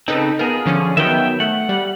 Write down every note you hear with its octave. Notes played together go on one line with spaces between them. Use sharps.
C#3 C4 D#4 A4 B4
B3 F4 G#4 A#4
D3 F3 C#4
D#3 F#3 B3 E5 G5
A3 F#5
G3